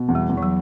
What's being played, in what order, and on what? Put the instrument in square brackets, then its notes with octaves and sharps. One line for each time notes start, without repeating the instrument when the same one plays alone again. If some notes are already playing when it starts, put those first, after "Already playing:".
Already playing: [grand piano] B2
E2
[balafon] G3
[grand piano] E2
[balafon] E3
F#3